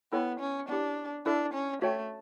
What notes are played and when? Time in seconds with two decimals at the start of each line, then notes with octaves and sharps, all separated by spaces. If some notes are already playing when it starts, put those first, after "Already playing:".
0.12 B3 E4 A4 C#5 G5
0.40 C#4
0.69 B3 D4 E4 G4
1.26 D4 E4 A4 E5
1.54 C#4
1.82 A3 F#4 C#5 G5